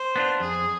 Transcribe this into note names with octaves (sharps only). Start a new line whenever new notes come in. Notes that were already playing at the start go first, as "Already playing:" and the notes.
Already playing: C5
B3 D4 F4
F2 G#4